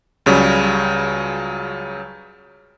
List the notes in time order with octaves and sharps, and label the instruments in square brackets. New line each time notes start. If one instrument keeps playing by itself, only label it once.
[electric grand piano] C#2 C#3 F#3 G3